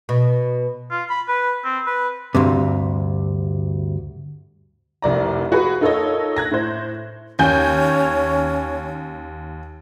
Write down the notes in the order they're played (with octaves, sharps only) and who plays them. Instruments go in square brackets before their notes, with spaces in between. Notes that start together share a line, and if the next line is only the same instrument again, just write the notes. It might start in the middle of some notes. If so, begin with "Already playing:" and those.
[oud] B2
[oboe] F4
B5
B4
C4
B4
[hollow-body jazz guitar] D2 G2 C3
[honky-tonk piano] F1 C2 D5 A#5
F4 F#4 G#4 B4
D#4 F4 A4 A#4 C#5 D#5
F#6 G#6 A#6
A2 C5
[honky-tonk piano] D#2 G#5 G6 [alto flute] C#4